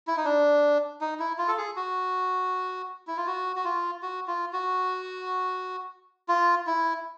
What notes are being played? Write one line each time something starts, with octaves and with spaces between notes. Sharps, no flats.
E4
D#4
D4
D#4
E4
F4
A4
G#4
F#4
E4
F4
F#4
F#4
F4
F#4
F4
F#4
F4
E4